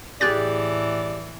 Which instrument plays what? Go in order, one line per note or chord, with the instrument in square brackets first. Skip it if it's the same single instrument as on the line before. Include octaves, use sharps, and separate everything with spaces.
[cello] A2 E3 [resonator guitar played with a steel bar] G4 G#4 [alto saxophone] D5 [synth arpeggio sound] F#6 A6